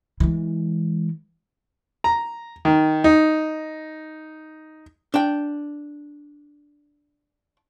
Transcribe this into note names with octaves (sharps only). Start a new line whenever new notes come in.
E3 G#3
A#5
D#3
D#4
D4 G5